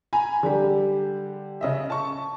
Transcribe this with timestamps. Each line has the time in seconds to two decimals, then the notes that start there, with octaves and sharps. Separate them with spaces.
0.13 G#5 A#5 B5
0.43 D3 G3 G4
1.61 C#3 D#5 E5
1.90 A5 C#6